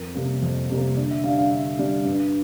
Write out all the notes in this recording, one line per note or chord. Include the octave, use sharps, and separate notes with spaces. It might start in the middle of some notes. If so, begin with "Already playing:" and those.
Already playing: F2 A#4
C3 G3 A#3
F2
C3 G3 A#3
D3 D5
E5
G3 D4 F5
F5
D3 E5
G3 D4
G2